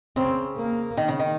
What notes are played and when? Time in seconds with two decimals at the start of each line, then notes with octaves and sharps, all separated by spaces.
0.16 C#3 C4
0.57 A#3
0.97 D#3
1.08 C#3
1.20 D#3